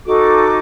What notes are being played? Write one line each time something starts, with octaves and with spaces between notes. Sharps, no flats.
D#4 F#4 A4 D6